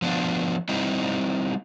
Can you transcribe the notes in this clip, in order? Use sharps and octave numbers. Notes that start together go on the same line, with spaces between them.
F3 B3 D4 F4
G3 C4 D#4 E4